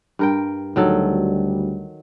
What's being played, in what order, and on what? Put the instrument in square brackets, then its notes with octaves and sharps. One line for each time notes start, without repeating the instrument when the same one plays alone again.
[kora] G2 A#4 G5
[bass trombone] D2 [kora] D#3 F#3 A4 [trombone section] G3